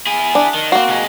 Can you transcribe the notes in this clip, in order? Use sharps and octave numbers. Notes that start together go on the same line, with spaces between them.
E4 G#4
D4
D#3
A#3 C4 F#4
C3 G#3